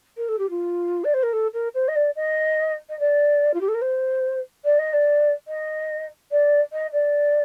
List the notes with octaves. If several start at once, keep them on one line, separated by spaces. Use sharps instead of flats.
A#4
A4
G4
F4
D5
C5
A#4
A4
A#4
C5
D#5
D5
D#5
D#5
D5
F4
G4
A4
A#4
C5
D5
D#5
D5
D#5
D5
D#5
D5